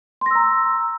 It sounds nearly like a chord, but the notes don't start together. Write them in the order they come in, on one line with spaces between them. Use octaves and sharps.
C6 A#6 E6 A#5